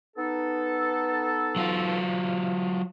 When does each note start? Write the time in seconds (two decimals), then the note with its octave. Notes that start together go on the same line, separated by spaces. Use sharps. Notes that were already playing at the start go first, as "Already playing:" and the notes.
0.17 B3 D#4 A4
1.56 F#3 F4